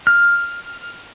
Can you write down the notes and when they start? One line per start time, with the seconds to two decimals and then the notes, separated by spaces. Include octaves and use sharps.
0.07 F6